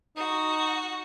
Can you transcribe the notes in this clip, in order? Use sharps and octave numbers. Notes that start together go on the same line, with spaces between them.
D#4 F#4